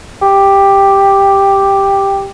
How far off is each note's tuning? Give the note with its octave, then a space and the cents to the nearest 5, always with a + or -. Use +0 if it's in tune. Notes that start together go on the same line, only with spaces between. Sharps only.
G4 +5